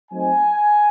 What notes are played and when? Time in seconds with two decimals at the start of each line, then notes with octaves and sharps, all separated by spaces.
0.12 F#3 A3 C4 D#4 G#5